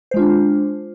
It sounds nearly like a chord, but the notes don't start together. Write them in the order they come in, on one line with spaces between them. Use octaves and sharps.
C5 G#3 F4 D4